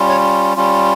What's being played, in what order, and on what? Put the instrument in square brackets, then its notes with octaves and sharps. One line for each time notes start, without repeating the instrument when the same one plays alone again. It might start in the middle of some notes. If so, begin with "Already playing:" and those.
Already playing: [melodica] G3 C#4 F4
C#5
G3 C#4 F4